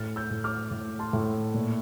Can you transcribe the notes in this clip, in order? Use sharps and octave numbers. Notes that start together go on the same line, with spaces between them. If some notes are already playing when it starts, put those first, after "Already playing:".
Already playing: A2 F6 A6
E6 G6
A2
D6 F6
A2
A5 C6
A2
A#2